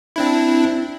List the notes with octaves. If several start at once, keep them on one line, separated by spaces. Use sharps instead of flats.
C4 D4 E4